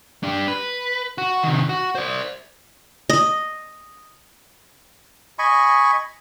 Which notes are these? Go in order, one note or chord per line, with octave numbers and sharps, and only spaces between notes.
D4 G4
B4
F#4
C3 D#3
F#4
C5 D5
D#5
D#5 G#5 B5 C#6